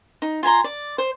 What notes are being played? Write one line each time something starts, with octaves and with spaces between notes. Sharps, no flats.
D#4
F4 G#5 A#5 C6
D5
C5